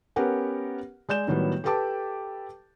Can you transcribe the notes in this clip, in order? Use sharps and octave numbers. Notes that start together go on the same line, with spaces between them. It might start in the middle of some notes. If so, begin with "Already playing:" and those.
B3 C#4 G4 A#4 B4 F#5
G#3 D5 G6 E7
A2 D#3 F#3 G3 B3
G4 A4 B4 G5 A5 D6